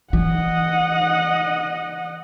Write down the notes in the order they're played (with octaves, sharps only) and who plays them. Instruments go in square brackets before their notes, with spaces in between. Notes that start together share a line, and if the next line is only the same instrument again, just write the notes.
[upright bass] E3 [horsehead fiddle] D#5 F#5